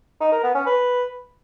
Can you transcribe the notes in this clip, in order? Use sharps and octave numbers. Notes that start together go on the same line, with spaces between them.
D#4
A#4
B3
C#4
B4